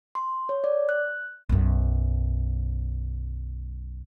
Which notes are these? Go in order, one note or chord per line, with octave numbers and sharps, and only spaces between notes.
C6
C#5
D5
F#6
B1 F#2